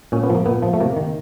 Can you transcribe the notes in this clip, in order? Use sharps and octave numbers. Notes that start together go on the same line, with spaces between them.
A#2 C#4
B3
F3
A#3
A#2 B3
F3
A3
C3 A#3
D#3